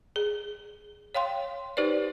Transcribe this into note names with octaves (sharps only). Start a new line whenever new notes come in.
G#4
C#5 F5 G5 C6
D#4 G4 B4 C5 D5